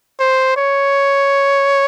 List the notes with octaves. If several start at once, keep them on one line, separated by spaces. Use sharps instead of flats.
C5
C#5